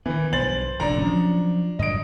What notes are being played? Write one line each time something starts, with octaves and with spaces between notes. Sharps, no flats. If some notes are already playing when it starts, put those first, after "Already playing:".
D#3 E3 B3
B1 G2 C5 A6 F#7
F1 A#2 D3 D4 A#5
F3 F#3 C#4
G2 D3 F#3 D#5 D7